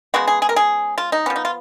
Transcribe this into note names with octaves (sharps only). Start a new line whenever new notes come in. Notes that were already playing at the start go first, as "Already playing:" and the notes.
C#3 G#3 B3 F#4
G#4
G#4
A#4
G#4
F4
D#4
F3 B3 C#4
D#4
F4